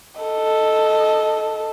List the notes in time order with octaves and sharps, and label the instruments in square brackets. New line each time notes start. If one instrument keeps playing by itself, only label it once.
[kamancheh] A4 D#5